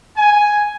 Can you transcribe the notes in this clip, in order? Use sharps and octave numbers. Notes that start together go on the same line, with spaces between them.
G#5